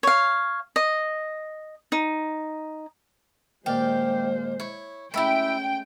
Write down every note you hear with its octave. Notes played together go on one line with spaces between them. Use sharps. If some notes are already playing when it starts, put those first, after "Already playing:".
C#5 F5
D#5
D#4
D#2 A#2 G#3 G4 C5 D5
E4 C#5
G#3 A3 C#4 E4 E5 G5 B5